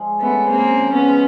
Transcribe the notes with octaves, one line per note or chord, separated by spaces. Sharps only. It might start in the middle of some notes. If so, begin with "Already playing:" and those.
Already playing: F3 G#3
C#3 A3 B3
C#3 A#3 C4
F3
B3 C#4
G#3